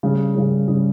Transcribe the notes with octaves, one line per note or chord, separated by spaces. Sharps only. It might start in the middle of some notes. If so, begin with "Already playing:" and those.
C#3 G3 C#4 G#4
C#3 G3 C#4 G#4
C#3 G3 C#4 G#4